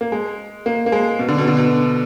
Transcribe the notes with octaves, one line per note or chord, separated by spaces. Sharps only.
A#3
G#3
A#3
A#3
G#3
B2
D3
B2
D3
B2